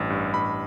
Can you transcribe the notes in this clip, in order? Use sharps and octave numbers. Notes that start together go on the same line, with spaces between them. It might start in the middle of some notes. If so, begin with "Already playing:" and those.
Already playing: A1 G2
G2
A1 B5